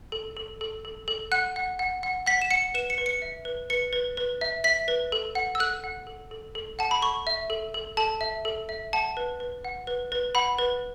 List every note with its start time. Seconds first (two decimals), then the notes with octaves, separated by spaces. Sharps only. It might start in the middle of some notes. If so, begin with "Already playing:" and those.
0.12 A4
0.37 A4
0.61 A4
0.85 A4
1.08 A4
1.32 F#5 F#6
1.56 F#5
1.79 F#5
2.03 F#5
2.26 F#5 B6
2.42 E7
2.51 F#5 C#7
2.74 B4 E7
2.90 C#7
2.98 B4
3.06 C#7
3.22 E5
3.45 B4
3.70 B4 C#7
3.93 B4
4.17 B4
4.41 E5
4.64 E5 B6
4.88 B4
5.12 A4
5.35 F#5
5.55 E6
5.60 A4 F#6
5.84 F#5
6.07 A4
6.31 A4
6.55 A4
6.79 F#5 A5
6.91 B5
7.02 A4 C#6
7.27 E5
7.50 A4
7.74 A4
7.97 A4 A5
8.21 E5
8.45 A4
8.69 E5
8.93 F#5 A5
9.17 B4
9.40 B4
9.65 F#5
9.87 B4
10.12 B4
10.35 F#5 B5
10.59 B4